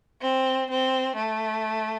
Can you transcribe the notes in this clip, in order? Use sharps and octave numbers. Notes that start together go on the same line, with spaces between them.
C4
C4
A3